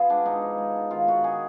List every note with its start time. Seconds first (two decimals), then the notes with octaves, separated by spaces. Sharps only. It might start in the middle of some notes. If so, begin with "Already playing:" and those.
Already playing: B3 F4 G#4
0.10 G#3 D4
0.26 B2 D#4
0.42 F3
0.58 G#3
0.75 D4
0.91 D#3 F4
1.08 D#3 F#4
1.24 D#3 G#4